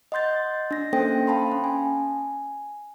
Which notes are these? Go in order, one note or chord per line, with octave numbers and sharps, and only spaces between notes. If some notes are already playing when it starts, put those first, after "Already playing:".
D#5 F#5 C6 G6 A6
D4 A#6
A#3 C#4 A4 C5 G5 A#6
F5 G5 A5 B5 C6
C#4
G#5